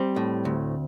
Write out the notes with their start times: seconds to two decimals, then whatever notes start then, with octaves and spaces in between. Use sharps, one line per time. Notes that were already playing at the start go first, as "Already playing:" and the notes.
Already playing: G3 C4
0.16 A2
0.45 D2